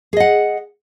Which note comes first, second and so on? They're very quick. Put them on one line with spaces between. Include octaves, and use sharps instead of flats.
G#4 D#5 F#5